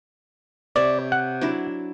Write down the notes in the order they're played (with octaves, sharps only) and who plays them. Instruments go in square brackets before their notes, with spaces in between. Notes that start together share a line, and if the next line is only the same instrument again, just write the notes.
[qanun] C3 C#5 E5 [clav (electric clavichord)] D5
[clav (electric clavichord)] F#5
[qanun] F#3 D4 E4